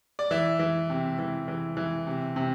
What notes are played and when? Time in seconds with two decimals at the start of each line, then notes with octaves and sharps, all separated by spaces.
0.19 D5
0.31 E3 E5
0.59 E3
0.90 C3
1.19 E3
1.48 E3
1.77 E3
2.07 C3
2.36 C3